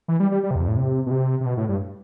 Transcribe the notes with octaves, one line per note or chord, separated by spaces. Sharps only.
E3
G3
G3
G3
C3
E2
F2
A2
C3
B2
C3
C3
B2
A2
G2